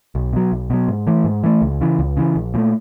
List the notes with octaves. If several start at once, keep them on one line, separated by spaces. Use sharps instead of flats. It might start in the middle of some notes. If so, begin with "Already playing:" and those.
B1
B2 F#3
B1
B2 F#3
G#2
E3 A3
G#2
E3 A3
C#2
C#3 E3
C#2
C#3 E3
A#1
A#2 F3 A3